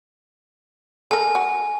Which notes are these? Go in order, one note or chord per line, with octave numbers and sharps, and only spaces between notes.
A4 A#4 G#5
F#4